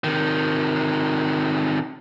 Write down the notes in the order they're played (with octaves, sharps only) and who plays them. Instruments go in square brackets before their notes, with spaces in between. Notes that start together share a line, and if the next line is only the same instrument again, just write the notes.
[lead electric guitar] C3 D#3